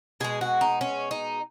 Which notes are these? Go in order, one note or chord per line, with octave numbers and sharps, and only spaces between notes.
B2 G#3 G#4
F#4
D#4
C#4
D#4